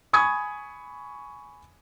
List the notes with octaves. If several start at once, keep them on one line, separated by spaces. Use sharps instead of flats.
G#5 B5 C#6 D#6 G#6